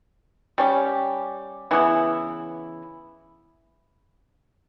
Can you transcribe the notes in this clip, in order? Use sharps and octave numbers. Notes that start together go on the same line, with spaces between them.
G3 C#4 G4
C#3 E3 B3 E4